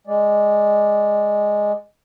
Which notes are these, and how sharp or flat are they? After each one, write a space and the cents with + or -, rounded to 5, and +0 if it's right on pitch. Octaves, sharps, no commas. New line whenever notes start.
G#3 +0 D5 +0